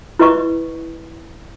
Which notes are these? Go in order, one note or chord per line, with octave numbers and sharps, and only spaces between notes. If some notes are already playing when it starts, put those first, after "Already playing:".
E4 B4 D#5 C#6